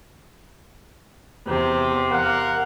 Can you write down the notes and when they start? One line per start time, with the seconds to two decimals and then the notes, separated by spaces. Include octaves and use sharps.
1.46 E2 C3
2.11 A#4 F5 F#5